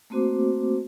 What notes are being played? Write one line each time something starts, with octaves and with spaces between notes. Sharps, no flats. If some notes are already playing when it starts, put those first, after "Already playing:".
A3 A#3 C4 F#4 C5 D6